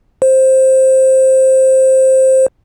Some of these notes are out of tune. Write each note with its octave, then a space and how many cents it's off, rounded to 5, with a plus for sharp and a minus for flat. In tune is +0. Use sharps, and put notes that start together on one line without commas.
C5 +10